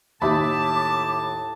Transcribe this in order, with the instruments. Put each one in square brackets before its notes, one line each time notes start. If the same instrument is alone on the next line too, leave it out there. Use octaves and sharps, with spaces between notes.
[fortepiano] D#2 [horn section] A2 A5 [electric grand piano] E5 B5 [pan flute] D6